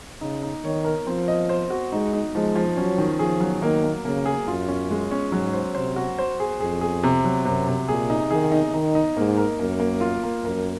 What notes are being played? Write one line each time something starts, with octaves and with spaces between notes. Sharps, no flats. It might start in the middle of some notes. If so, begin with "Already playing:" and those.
C#3 D#4
D#4
D#3 C#5
A#4
F3 C4
D#5
C5
F#4
G#3 D#4
D#4
F3 G#3
F3
F#3 C#4
D#3
F3 G#4
F#3
D#3 A#3
A#3
C#3 A#3
G#4
F#2 F4
C#4
G#3
C#4
G#2 F#3
C5
C3 C5
F#4
C5
G#4
F2 G#4
G#4
C3
F#3
F#2 C3
C3
A#2 G#4
D#4
D#3 G#4
D#4
D#3 D#4
D#4
G#2 A#3
A#4
F#2 A#3
A#3
F4
A#3
F#2 A#4